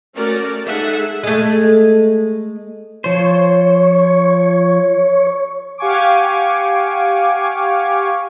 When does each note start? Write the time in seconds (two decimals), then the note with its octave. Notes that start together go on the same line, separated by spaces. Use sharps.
0.14 A3 C#4 F#4 A#4 D5
0.66 G#3 D#4 G#4 A4 E5 F#5
1.23 G#3 A3
3.04 F3 C5 C#5
5.78 G4 F5 F#5 G#5 C#6 D6